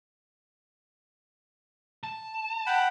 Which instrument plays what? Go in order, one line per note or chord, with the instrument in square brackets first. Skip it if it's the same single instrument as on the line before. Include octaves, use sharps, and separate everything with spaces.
[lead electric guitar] A5
[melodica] F#5 G5 B5